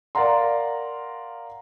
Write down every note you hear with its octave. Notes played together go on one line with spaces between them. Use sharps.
A#4 D5 F5 F#5 A#5 C6